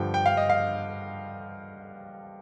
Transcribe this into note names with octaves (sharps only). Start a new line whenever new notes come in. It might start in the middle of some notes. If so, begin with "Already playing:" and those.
Already playing: G2 D3 F3 G5
G5
F5
D#5
F5